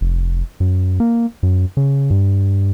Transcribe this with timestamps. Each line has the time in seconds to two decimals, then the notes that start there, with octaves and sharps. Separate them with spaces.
0.01 F1
0.60 F#2
1.00 A#3
1.43 F#2
1.77 C#3
2.10 G2